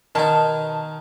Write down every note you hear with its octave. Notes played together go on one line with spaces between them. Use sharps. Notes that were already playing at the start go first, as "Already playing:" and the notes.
B2 D#3 D#4 A5